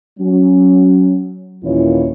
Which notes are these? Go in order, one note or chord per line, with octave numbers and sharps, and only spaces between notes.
F#3 C#4
D#2 A#2 E3 C#4 E4 C#5